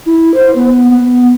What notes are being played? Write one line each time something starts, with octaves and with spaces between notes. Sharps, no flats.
E4
C5
B3
B3